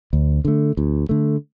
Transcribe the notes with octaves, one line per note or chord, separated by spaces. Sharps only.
D2
D3 A3
D2
D3 A3